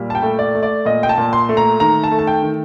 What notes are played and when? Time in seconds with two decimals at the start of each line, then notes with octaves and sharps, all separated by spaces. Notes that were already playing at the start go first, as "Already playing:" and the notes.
Already playing: A#2 G3
0.10 A5
0.15 G5
0.22 A3
0.39 D5
0.55 A3
0.63 D5
0.85 A#2 D#5
1.03 G5
1.09 A5
1.18 A#2
1.33 C6
1.49 A3
1.57 A#5
1.80 D#3 A#5
2.04 A5
2.11 A3
2.19 A5
2.27 G5
2.43 D#3